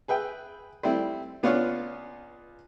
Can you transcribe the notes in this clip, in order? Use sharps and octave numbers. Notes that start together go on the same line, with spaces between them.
G#4 B4 E5 G5
G3 A3 C4 E4
C#2 B3 D4 F4 C#5 F5